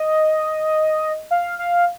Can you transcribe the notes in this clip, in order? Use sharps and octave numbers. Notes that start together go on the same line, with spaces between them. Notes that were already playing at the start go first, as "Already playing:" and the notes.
Already playing: D#5
F5
F5